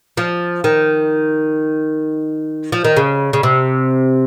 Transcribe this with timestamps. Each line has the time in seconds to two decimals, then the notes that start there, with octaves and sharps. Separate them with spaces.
0.17 F3
0.64 D#3
2.72 F3
2.84 D#3
2.97 C#3
3.33 C#3
3.43 C3